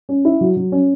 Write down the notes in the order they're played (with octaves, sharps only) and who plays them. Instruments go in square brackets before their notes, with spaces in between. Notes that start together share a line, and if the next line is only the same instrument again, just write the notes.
[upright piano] C#4
E4
F#3
F#3
C#4